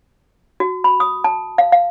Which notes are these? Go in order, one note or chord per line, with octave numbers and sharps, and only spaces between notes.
F#4
B5
D#6
A5
F5
F5